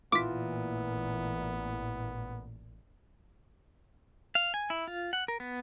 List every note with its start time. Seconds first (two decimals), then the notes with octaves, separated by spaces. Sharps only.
0.12 A1 A#2 E3 B3 F4 D6 B6
4.35 F5
4.54 G#5
4.70 E4
4.88 F4
5.13 F#5
5.28 A#4
5.40 B3